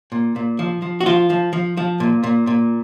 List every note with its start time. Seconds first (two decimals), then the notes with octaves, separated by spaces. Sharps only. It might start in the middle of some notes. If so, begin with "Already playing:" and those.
0.12 A#2
0.36 A#2
0.59 F3
0.82 F3
1.01 F#4
1.06 F3 F4
1.30 F3
1.53 F3
1.77 F3
2.00 A#2
2.24 A#2
2.47 A#2